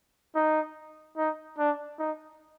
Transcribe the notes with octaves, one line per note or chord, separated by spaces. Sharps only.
D#4
D#4
D4
D#4